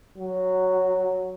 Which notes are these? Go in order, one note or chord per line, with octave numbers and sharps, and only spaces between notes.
F#3